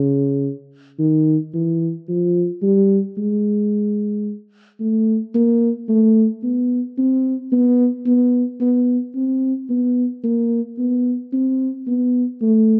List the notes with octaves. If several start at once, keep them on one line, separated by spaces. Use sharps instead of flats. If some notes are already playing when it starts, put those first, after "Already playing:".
Already playing: C#3
D#3
E3
F3
G3
G#3
A3
A#3
A3
B3
C4
B3
B3
B3
C4
B3
A#3
B3
C4
B3
A3